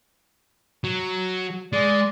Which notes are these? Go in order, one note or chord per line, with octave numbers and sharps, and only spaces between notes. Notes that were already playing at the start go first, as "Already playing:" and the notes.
F#3
G#3 D5